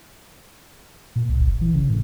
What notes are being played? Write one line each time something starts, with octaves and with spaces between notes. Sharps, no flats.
A#2
C2
G1
E3
C#3
A2